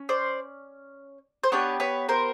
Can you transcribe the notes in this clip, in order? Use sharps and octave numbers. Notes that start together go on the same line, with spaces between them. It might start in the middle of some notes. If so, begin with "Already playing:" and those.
Already playing: C#4
C5 D5
C5
B3 D4 G4 B4 C#5
B4 C#5
A#4 C5